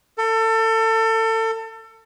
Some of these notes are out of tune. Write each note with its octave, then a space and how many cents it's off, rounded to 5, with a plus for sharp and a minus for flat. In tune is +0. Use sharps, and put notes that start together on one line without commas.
A4 +30